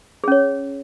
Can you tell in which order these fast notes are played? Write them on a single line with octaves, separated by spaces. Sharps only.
G#4 C#4 C#5